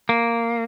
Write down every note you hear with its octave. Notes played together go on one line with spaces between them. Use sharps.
A#3